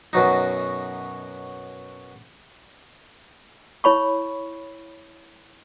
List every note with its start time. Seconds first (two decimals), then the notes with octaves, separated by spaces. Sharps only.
0.13 F#2 B2 F#3 D#4
3.84 E4 C#5 B5 C#6